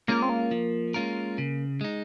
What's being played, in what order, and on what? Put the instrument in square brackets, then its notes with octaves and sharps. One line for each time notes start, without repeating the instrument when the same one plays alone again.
[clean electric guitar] G#3 C#4 F4 A#4 [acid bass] A#3
[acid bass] C4
A#3
[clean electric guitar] F3
G#3 C#4 F4 A#4
C#3
G#3 D#4